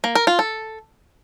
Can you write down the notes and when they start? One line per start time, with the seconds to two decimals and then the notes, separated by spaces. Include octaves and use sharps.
0.04 A#3
0.15 A#4
0.27 F4
0.39 A4